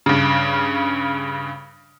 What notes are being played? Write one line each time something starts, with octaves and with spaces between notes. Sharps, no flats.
G2 C#3